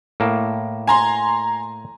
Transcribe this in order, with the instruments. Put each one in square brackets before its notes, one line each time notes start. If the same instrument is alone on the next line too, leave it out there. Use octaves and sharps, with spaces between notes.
[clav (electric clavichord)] A2 A#3 A5
[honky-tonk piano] G#5 A#5 C6